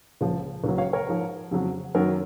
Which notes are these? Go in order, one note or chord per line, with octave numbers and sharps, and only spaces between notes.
C#2 C#3 F3
C#2 C#3 F#3
C#5 F5
A#4 C#5
G#2 F3
F2 C#3 F#3
F#2 D#3 F#3 F#4 A#4